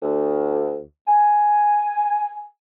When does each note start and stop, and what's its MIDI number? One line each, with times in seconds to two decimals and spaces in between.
0.03 0.80 38
1.08 2.45 80